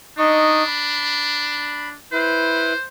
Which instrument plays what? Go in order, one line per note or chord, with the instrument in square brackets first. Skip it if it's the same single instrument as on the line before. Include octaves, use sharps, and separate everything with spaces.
[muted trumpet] D4 [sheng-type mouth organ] D#4 D#5 C#6
[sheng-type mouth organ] B5
[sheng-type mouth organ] E4 B4 [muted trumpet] C5